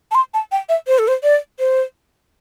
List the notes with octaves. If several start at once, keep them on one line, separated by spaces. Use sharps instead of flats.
A5
C6
A5
G5
E5
C5
A4
C5
D5
C5